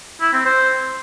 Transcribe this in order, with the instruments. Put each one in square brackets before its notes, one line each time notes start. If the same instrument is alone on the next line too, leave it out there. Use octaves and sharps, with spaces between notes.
[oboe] E4
C4
C5